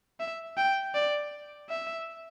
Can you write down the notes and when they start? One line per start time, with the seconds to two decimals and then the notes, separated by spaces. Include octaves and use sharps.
0.20 E5
0.57 G5
0.95 D5
1.69 E5